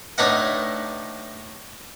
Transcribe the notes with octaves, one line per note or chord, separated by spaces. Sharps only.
A2 D4 D#4 B4 D#5 F#5